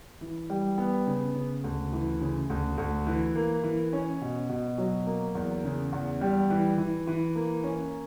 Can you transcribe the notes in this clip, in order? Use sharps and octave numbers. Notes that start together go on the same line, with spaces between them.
E3
G3
B3
C#3
C#3
D2
E3
C#3
D2
D2
E3
A#3
E3
C#4
B2
B2
F#3
A#3
E2
C#3
E2
G3
E3
E3
E3
A#3
C#4